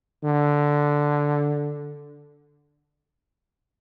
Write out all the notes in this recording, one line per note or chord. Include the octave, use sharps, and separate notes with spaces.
D3